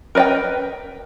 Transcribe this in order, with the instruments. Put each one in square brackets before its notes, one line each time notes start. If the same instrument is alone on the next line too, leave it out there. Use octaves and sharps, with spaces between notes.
[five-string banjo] A#4 B4 D5 D#5 G5